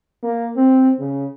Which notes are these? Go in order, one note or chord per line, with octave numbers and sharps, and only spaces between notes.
A#3
C4
C#3